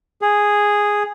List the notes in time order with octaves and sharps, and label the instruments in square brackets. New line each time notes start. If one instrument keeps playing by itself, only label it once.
[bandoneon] G#4